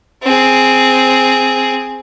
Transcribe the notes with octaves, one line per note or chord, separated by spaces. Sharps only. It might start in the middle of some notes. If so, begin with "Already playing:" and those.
C4 G#4